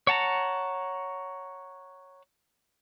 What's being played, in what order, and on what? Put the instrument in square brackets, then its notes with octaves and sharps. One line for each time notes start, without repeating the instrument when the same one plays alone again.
[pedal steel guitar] C#5 F#5 A5 A#5